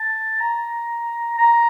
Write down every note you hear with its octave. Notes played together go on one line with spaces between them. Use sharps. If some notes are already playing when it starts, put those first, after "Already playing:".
Already playing: A5
A#5
A#5